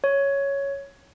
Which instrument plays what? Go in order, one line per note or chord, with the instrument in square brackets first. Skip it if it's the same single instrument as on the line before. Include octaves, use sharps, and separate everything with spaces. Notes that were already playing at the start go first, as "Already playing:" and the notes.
[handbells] C#5